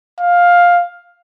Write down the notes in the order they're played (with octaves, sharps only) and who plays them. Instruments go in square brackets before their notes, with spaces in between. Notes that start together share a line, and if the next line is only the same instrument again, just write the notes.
[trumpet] F5